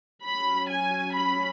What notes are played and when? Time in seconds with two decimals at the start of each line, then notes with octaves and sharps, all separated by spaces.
0.23 F#3 C#4 B5
0.69 G#5
1.14 B5